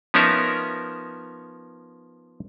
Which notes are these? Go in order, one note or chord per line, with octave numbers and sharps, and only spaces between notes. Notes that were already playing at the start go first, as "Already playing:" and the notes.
F3 B3 C#4 D#4 A#4 E5